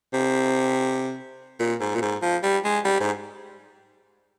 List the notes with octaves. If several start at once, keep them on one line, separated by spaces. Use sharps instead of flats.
C3
A#2
G#2
A#2
G#2
F3
G3
G#3
G3
G#2